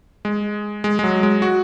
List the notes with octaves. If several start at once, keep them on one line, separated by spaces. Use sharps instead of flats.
G#3
G#3
G#3
F#3
G#3
F#4